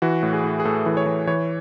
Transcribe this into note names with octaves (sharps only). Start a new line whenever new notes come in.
E3 F#4
A2
G#4
A2
G#4
A2 A4
E3
C#5
E3
E3 C#5